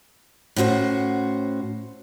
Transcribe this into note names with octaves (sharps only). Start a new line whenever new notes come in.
A2 C#4 F#4 C5 F#5